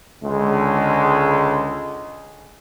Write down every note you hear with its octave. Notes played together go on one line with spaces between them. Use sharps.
C#2 D3 G#3